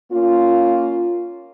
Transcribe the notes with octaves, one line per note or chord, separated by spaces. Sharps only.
A#3 C#4 F4